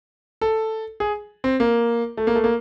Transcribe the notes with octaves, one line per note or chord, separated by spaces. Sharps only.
A4
G#4
C4
A#3
A3
A#3
A3
A#3